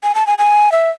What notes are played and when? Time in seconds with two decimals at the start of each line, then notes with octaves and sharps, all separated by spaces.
0.03 G#5
0.15 A5
0.27 G#5
0.38 G#5
0.72 E5